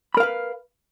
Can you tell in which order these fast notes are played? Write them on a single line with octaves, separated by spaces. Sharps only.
B5 A#4 F5 B4